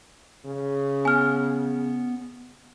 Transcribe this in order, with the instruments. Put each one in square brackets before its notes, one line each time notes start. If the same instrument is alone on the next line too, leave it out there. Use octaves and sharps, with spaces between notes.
[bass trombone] C#3
[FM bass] B3 [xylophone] G#5 F6